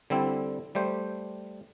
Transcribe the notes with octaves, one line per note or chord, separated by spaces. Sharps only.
D3 G3 C4 E4
G3 A3 C5